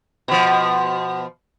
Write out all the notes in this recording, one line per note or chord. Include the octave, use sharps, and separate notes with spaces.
B2 F3